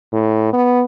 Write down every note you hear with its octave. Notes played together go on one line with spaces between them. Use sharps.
A2
B3